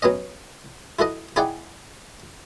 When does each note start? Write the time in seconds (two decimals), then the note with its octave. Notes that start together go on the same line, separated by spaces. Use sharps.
0.02 F#3 B3 C#4 D#5
0.99 E4 F#4 A4 D#5
1.36 D#4 E4 G#4 D5 F#5 G5